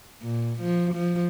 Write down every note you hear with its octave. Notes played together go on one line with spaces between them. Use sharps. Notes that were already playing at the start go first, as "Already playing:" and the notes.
A#2
F3
F3